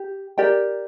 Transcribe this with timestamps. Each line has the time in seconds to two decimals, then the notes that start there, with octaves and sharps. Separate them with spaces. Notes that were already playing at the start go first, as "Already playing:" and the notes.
Already playing: G4
0.38 G4 A#4 D5 G5